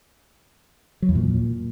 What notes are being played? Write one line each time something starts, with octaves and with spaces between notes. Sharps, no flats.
F#3
E2
A#2